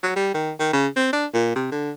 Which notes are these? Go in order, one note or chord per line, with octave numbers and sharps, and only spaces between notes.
F#3
G3
D#3
D#3
C#3
C4
D4
A#2
C3
D3